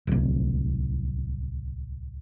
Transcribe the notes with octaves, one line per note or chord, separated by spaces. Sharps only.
D1 C2